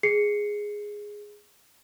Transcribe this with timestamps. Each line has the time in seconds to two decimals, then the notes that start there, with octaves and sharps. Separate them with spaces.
0.03 G#4 C7 C#7